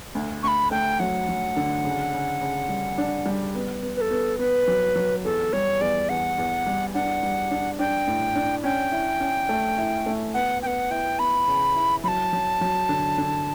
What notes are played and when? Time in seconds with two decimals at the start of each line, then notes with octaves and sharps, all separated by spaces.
0.15 D2
0.43 D2 B5 C#6
0.71 A3 G5
0.99 F#3 F#5
1.29 F#3
1.56 D3
1.84 C#3
2.13 C#3
2.41 C#3
2.69 G3
2.98 D4
3.26 G3
3.55 B3
3.83 B3
3.97 B4
4.01 A4
4.11 B3
4.39 B3 B4
4.67 F#3
4.95 F#3
5.24 E2 A4
5.53 G3 C#5
5.81 E2 D5
6.09 E2 F#5
6.38 E2
6.66 G3
6.94 D4 F#5
7.23 G3
7.51 D4
7.79 D4 G5
8.08 A2
8.35 D4
8.64 C#4 G5
8.92 E4
9.20 C#4
9.49 A3
9.78 E4
10.06 A3
10.34 B3 F#5
10.62 B3 F#5 G5
10.90 E4 G5
11.19 B3 B5
11.48 C#3
11.75 E4
12.04 F#3 B5
12.08 A5
12.33 F#3
12.61 F#3
12.89 D3
13.18 D3